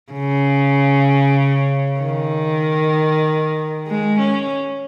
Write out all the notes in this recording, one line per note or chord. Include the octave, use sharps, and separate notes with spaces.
C#3
D#3
G#3
C#4